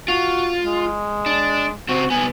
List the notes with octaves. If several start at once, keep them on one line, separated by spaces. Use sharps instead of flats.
F4 F#4
G#3
D4
C#3 C4 F#4
C2 B3 G#5